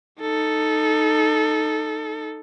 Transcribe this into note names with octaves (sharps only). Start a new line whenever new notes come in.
D#4 A4